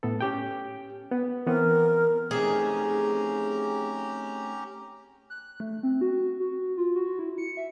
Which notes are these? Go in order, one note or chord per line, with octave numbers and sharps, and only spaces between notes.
A2 B3 A4
C#4 G4 G5
B3
E3 B3 C4 A#4
A3 C4 C#4 D#4 G4 G#4 A#5
F#6
A3
C4
F#4
F#4
F4
F#4
E4
C#7
E5